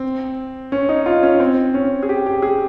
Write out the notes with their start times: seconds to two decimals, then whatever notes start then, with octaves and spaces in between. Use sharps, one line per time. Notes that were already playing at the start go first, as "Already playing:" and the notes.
Already playing: C4
0.72 C#4
0.89 D#4
1.06 F4
1.23 C#4
1.40 C4
1.74 C#4
2.03 G#4
2.09 G4
2.26 G4
2.42 G#4